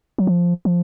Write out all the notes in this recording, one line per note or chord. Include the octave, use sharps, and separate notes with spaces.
F#3
F3
F3